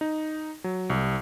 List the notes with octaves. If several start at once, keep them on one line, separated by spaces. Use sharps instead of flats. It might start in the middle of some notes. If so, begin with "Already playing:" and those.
D#4
F#3
C2